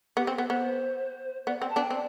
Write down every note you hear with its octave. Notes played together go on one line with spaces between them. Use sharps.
B3 G4
C4 A4
B3 A4
B3 C5
B3 D5
C4 F#5
A5
B3 D4
G5
C4 D5